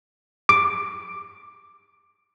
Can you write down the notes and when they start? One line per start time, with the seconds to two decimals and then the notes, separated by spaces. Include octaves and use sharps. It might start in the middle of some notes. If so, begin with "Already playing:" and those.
0.49 D6 D7